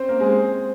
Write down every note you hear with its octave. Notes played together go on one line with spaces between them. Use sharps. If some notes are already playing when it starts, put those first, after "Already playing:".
Already playing: C4 C#4 C5
A#3 A#4
G#3 G#4
C4 C5